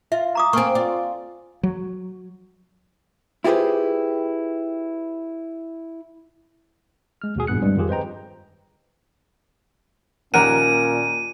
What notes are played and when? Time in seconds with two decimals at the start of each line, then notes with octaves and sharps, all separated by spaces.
0.12 F4 E5
0.35 A#5 D6 D#6
0.53 A#3 C4 G#5 C#6
0.75 F4 D5
1.63 F#3
3.44 E4 F4 G4 G#4 B4 C5
7.22 G#3 F6
7.36 D#2 B2 F#4 G#4
7.47 G#1 G2 A#2 B3 F#6 C#7
7.62 G2 G3 G#3 C4
7.76 F2 D#3 F3 F4 G4 G#4
7.89 B4 C5 D#5 G5 A#5
10.34 D#2 A#2 C#4 A#4 F#5 D#7